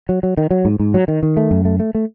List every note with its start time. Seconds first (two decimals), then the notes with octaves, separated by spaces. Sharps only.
0.09 F#3
0.23 F#3
0.37 D#3
0.51 F#3
0.65 G#2
0.80 G#2
0.94 F#3
1.08 D#3
1.23 D#3
1.37 A3
1.51 F#2
1.65 A3
1.80 A3
1.95 A3